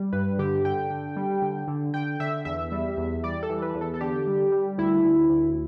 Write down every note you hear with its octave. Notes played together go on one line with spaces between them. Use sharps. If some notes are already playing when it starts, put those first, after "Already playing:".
Already playing: G3
G2 B4
D3 G4
D3 G5
D3
G3
D3
D3
D3 G5
D3 E5
E2 E5
G3
E2
G3 D5
A4
E3
B4
E2
A4
A4
D3 G4
G3
G3
D2 E4
D2
D2